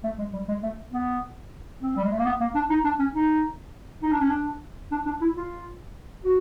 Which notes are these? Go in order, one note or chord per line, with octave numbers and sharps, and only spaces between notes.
A3
G#3
G3
G#3
A3
B3
C4
G3
G#3
A3
A#3
B3
A#3
D4
D#4
D4
C#4
D#4
D#4
D4
C#4
D4
D4
D4
E4
F4
F#4